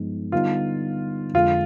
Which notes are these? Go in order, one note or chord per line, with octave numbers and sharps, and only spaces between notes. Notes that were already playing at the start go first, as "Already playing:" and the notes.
Already playing: G2 F3 G#3 B3 D#4
D3 G3 B3 D#4 F4
F2 D3 G#3 F4